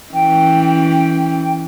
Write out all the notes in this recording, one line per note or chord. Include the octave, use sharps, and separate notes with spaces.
E3 C#4 G5